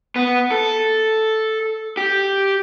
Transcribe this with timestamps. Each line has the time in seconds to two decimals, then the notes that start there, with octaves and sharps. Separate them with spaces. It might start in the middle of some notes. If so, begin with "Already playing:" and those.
0.16 B3
0.51 A4
1.97 G4